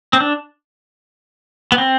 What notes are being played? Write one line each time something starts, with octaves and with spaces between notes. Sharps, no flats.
C4
D4
B3
C4